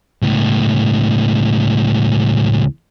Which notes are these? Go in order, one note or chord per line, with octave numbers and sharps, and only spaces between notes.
C#2 A2